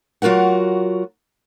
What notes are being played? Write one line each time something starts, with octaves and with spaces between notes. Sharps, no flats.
F#3 F4 F#4 A#4 F#5